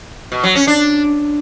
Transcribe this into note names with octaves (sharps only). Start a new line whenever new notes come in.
B2
F#3
C#4
D4